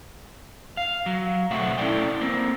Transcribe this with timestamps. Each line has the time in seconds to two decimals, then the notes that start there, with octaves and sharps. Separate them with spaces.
0.77 F5
1.06 F#3
1.51 B1 A3 C4 F#4 E5 F#5
1.78 C#4 E4 G4 A4 D5 G5
2.21 A#3 C4